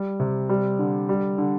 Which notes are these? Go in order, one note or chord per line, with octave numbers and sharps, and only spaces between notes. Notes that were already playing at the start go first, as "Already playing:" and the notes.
Already playing: G3
C3
G3
D3
G3
D3